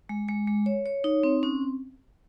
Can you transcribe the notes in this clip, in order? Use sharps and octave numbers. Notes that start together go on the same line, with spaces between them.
G#3
G#3
G#3
C#5
C#5
D#4
C4
C#4